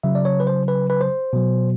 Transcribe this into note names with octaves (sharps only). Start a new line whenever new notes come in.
C#3 F#3 E5
D5
C#5
B4
C5
B4
B4
C5
B2 F#3